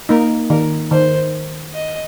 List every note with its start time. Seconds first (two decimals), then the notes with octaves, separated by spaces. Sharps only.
0.09 A#3 D#4 A#4
0.50 D#3 A#4
0.91 D#3 C5
1.73 D#5